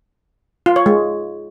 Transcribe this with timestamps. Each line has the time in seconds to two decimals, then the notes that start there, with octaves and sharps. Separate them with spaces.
0.66 F4
0.76 C#5
0.86 G#3